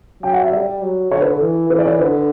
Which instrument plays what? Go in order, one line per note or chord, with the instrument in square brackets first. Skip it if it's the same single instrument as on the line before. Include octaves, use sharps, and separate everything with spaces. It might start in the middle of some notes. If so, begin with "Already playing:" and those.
[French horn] F#3 [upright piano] G5
[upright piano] F#5
E5
[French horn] G3 [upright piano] D5
[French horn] F#3
[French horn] D3 [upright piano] C#5
[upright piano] B4
A4
[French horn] E3
[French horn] E3 [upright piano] B4
[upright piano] D5
C#5
[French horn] D3 [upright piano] B4